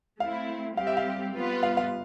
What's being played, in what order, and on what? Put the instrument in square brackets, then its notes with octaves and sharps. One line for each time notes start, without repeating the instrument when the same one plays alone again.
[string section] A3 C4 E4 [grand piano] F5
[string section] G3 C4 G4 [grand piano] F5
[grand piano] E5
F5
[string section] G3 B3 F4 B4
[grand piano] F5
F5